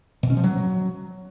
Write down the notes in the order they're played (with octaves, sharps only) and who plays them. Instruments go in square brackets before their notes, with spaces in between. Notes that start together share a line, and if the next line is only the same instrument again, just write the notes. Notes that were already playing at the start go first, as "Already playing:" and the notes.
[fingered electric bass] B2
C#4
F3
F#3